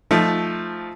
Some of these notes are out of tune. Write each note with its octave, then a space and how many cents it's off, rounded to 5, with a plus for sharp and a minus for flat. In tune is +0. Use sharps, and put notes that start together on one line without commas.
F3 +0 A3 +0 D#4 +0